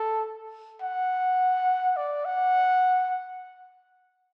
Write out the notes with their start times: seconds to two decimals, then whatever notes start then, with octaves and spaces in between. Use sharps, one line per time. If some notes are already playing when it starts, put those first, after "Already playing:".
Already playing: A4
0.82 F#5
1.97 D5
2.25 F#5